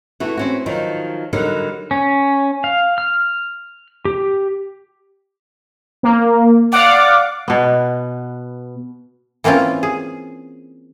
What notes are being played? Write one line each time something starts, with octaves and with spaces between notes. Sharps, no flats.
E3 A3 F#4
C4 C#4 F#4
D#3 F3 F#3 D#4
D3 F#3 G3 D#4 A#4
C#4
F5
F6
G4
A#3
D5 F5 F#5 D6
B2 B3
E3 A#3 C4 C#4 F4
G#4